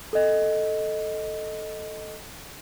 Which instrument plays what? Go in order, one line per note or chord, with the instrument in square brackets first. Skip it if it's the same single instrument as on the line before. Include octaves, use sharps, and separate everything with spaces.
[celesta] A4 D#5